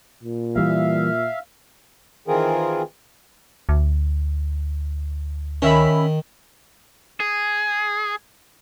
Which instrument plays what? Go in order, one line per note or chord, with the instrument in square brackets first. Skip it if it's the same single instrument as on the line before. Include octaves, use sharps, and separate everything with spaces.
[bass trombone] A#2
[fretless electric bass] E3 G3 A#3 [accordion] E5 F5
[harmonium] D#3 E3 C4 F4 G#4 A#4
[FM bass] D2
[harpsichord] D#3 [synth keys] C#4 E5 B5
[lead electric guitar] G#4